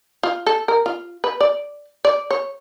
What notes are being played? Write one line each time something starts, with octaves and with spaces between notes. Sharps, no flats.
F4
A4
A#4
F4
B4
D5
D5
C#5